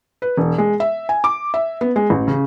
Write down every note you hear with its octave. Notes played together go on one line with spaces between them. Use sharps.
B4
E1
G#3
E5
G#5
D6
E5
B3
G#3
A1
C#3